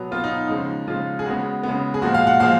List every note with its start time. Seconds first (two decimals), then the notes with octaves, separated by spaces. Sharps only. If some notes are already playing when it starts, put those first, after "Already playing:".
Already playing: B2 F#3 B3
0.11 B2 F#3 B3 F4
0.24 D#4
0.47 C#3 F3 G#3 D#4
0.87 C#3 F3 G#3 F4
1.19 G#4
1.26 C#3 G#3 B3 F#4
1.63 C#3 G#3 B3
1.94 G#4
2.02 A#2 F3 G#3 F#4
2.14 F5
2.27 F#5
2.40 A#2 F3 G#3 F5